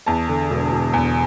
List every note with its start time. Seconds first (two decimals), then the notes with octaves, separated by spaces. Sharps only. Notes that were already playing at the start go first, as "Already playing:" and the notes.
0.06 E2 A5
0.29 D3
0.50 E1
0.72 E1
0.93 E2